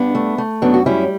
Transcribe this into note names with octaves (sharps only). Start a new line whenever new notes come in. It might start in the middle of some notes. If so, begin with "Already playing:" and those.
Already playing: G2 B3 D4
A3
A3
F#2 B3 D4
F#4
G3 C#4 E4